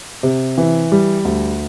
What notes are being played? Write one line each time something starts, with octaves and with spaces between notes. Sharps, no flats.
C3
E3
G3
D2